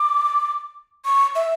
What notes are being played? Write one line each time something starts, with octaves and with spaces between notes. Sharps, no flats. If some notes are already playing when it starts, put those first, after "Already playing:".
Already playing: D6
C#6
E5